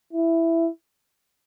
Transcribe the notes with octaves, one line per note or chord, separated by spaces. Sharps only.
E4